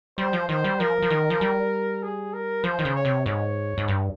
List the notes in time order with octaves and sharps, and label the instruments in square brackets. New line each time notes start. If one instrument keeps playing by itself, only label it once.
[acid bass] G3 [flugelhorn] C5
[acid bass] F3
[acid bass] D#3 [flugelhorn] C5
[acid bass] G3
[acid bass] F3 [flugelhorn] A#4
[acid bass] F3
D#3
F3
G3
[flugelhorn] G#4
A#4
[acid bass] F3 [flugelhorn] C5
[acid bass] D#3
C#3
[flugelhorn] C#5
[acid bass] C3
[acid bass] G#2 [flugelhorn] C#5
[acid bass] G#2
G2